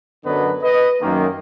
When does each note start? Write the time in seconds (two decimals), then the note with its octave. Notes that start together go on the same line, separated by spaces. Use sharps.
0.25 F#2 D3 F#3 B3 D4 B4 D#5
0.63 B4 D#5
1.01 F#2 D#3 A#3